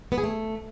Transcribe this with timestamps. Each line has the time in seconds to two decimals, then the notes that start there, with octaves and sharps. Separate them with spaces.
0.12 B3
0.18 G#4
0.24 A3